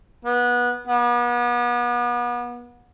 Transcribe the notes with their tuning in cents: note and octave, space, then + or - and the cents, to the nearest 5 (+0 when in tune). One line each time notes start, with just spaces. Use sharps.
B3 -25
B3 -35